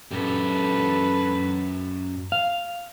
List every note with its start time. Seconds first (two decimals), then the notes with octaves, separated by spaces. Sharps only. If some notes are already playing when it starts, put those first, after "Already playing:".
0.11 F#2 G4 A4 B4
2.32 F5